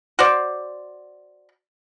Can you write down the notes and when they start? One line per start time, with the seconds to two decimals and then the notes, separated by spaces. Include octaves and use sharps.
0.19 F#4 C5 D5